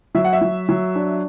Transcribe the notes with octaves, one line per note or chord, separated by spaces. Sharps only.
F#3 E5
F#5
E5
F#3
F#3
D4